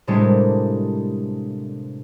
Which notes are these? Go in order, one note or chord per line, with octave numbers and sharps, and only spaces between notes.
A2 C3 G3 G#3 A#3 D4